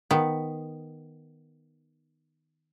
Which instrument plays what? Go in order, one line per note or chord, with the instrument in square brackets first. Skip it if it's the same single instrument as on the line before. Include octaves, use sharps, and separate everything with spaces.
[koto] D#3 B3